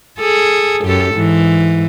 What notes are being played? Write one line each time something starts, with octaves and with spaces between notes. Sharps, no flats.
G#4 A4
F#2 G4 A4
G#2 E3